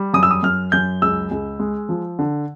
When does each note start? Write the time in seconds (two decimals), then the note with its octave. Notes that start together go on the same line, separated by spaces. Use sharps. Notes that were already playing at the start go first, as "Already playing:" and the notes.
Already playing: G3
0.14 F#2 D#6
0.23 E6
0.31 D#6
0.43 F#2 F6
0.72 F#2 G6
1.02 C#2 E6
1.31 C#2
1.60 G#3
1.89 F3
2.19 D3